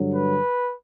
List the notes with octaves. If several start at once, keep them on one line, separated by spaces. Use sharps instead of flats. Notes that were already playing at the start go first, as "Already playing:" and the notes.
Already playing: G2 D3 F#3
B4